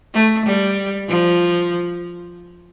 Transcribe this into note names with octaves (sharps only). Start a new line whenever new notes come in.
A3
G3
F3